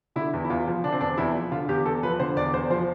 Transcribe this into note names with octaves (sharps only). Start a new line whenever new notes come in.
D3 E4
E2
E4
E2 F4
F3
D3 D4
C4
E2 D4
E2 E4
F3
D3 F4
E2 G4
E2 A4
F3 B4
D3 C5
E2 D5
E2 C5
F3 C5